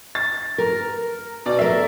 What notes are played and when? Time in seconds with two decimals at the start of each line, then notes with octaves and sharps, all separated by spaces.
0.15 A6
0.58 A#4
1.46 B2 D5
1.59 A4 A#4 E5